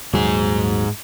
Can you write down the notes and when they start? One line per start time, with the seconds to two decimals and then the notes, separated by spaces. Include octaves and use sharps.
0.13 D#1 D#2 G#2 F#3 G#4